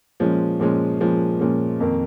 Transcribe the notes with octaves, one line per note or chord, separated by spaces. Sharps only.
A#2 F3 G#3 C#4
A#2 F3 G#3 C#4
A#2 F3 G#3 C#4
A#2 F3 G#3 C#4
F2 D#3 A#3